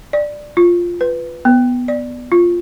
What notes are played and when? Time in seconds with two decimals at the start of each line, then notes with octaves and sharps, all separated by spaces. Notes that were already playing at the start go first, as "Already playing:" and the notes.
0.13 D5
0.57 F4
1.01 B4
1.45 B3
1.88 D5
2.32 F4